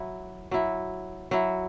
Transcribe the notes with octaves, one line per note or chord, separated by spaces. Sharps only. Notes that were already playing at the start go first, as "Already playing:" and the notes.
Already playing: F#3 E4
F#3 E4
F#3 E4